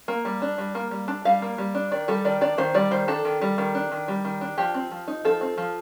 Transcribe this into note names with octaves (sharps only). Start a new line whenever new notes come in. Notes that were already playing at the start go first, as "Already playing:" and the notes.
A#3
G3
D4
G3
A#3
G3
D4
G3 F5
A#3
G3
D4
D#3 D5
G3 A4
D#3 D5
D4 D5
D#3 C5
G3 D5
D#3 C5
D4 A4
D#3
G3
D#3
D4
D#3
G3
D#3
D4
F3 G4
C4
F3
D#4
F3 A4
C4
F3